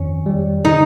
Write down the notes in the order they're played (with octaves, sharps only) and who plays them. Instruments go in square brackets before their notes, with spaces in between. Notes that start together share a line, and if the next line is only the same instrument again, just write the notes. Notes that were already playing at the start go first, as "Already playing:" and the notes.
Already playing: [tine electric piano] F2 D#3 [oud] C#4
[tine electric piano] G3
[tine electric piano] D3 [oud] D#4